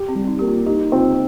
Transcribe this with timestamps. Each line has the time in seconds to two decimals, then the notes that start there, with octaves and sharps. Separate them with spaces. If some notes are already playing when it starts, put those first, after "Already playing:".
Already playing: G4
0.09 C4
0.15 G3
0.24 C4
0.28 D#4
0.39 A#3 G4
0.47 F4
0.66 D#4 G4
0.92 C4 F4